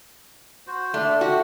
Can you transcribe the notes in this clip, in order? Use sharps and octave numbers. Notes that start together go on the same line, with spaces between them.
F#4 C5
A3 D4
F#4 G4